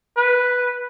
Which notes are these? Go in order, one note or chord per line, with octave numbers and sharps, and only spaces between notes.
B4